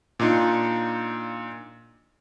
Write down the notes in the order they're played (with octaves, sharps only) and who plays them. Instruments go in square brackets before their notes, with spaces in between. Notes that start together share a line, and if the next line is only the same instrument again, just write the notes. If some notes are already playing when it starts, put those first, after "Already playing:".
[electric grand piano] A#2 D4 D#4 F4